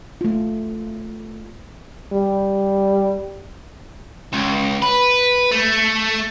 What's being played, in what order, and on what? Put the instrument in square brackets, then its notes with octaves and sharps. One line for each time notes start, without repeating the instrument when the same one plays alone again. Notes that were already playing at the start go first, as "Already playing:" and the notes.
[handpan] A3 F4
[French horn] G3
[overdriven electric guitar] C#2
B4
A3